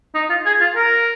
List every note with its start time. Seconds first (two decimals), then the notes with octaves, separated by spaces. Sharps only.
0.15 D#4
0.29 F4
0.45 G#4
0.60 F4
0.76 A#4